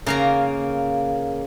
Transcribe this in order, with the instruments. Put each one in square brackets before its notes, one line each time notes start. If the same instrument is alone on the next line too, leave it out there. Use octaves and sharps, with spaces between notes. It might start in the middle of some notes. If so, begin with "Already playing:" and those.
[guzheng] C#3 F5 A#5 [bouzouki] A#3